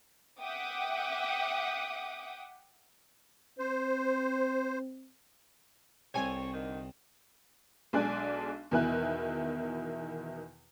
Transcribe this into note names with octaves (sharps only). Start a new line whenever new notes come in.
E5 F#5 G5 D6 D#6
C4 C5
C2 C3 C4 A4 C#5 G#5 D#7
D3 D#3
B1 G#3 D4 G#5 F#6
E2 B2 D#3 E4 G#5 F#6